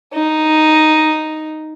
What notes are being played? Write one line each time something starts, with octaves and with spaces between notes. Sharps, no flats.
D#4